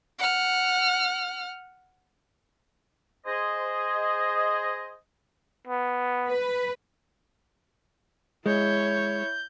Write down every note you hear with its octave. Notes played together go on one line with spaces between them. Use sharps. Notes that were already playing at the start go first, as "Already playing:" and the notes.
F#5 F6
G#4 C5 D#5
B3
B4
G#3 E4 C#5 G6